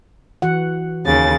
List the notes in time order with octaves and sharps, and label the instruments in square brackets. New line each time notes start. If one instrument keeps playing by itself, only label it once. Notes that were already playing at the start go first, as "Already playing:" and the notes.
[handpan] E3 F#4 F#5
[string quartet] D#2 C#3 A6